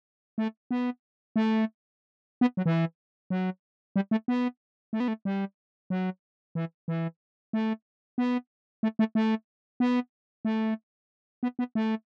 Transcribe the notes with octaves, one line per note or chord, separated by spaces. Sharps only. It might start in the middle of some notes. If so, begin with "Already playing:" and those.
A3
B3
A3
B3
F#3
E3
F#3
G3
A3
B3
A3
B3
A3
G3
F#3
E3
E3
A3
B3
A3
A3
A3
B3
A3
B3
B3
A3